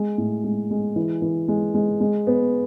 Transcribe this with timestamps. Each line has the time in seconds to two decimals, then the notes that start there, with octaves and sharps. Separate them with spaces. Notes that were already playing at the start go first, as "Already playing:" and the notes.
Already playing: G#3
0.18 A2
0.44 G#3
0.70 G#3
0.96 E3
1.22 E3
1.48 G#3
1.74 G#3
2.00 G#3
2.27 B3